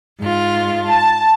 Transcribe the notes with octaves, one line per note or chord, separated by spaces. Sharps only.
G#2 F4
A5